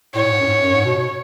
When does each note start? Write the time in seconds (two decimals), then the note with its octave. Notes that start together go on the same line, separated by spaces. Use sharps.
0.15 A2 C#5
0.26 A2
0.31 G#2
0.40 F#2
0.46 G#2
0.62 F#2
0.74 G#2
0.85 B2
0.97 B2